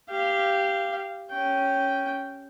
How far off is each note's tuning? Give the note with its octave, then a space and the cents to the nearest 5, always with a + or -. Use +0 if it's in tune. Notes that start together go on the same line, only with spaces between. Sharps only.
G4 +0 F5 -20
C#4 +0 G5 -10